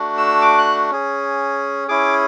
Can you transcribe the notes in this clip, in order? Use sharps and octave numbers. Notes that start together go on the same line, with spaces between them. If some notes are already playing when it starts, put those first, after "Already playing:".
Already playing: A3 D4 F#4
E6
D6
F#6
C#4 G#4
C#4 E4 G#4 D6